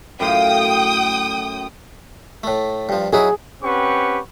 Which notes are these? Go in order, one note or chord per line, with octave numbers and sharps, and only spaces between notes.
F#2 A2 F5 G5 D#6
A2 A3
G2 F3
F#3 D#4 E4 G#4
C4 C#4 G4 B4 F#5 C#6